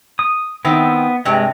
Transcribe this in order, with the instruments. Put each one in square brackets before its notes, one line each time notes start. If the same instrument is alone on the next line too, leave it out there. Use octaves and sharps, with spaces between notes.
[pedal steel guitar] D#6
[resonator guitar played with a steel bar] D#3 C4 E4 [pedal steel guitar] B3
[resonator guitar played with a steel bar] G2 C3 [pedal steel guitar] G#3